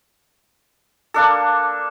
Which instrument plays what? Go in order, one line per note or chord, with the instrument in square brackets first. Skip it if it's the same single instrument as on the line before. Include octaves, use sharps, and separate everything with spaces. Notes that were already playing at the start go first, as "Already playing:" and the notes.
[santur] A#3 D4 A4